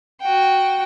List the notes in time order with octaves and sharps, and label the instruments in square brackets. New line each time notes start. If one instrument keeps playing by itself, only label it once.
[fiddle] F#4 G5